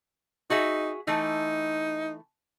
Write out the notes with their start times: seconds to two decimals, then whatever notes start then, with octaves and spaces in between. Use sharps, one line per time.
0.50 D#4 F#4 G#4 E5
1.07 E3 A3 D#4